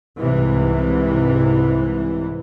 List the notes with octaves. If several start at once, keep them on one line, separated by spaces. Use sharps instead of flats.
C2 G#2 C3 E3